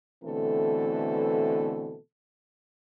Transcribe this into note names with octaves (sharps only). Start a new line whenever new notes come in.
B2 D3 E3 A3 C4 A4